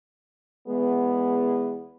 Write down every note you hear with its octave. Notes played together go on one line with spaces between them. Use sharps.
E2 G#3 B3